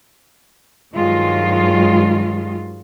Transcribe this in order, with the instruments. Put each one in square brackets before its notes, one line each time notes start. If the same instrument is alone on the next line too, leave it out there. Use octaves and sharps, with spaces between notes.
[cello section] G2 D#3 F#3 G#3 F4